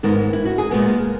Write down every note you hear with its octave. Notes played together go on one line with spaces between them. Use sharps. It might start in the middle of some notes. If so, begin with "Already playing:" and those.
G#2 D#3 G#3 B3 A#4
E4
F#4
G#4
A#2 G#3 B3 A#4